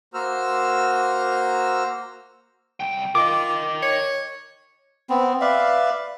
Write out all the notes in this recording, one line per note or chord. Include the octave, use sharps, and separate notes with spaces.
A#3 F#4 C5 A#5 E6 F6
C2 G5
F4 A#4 D#5 D6
C#5
B3 C4
B4 D5 E5 F5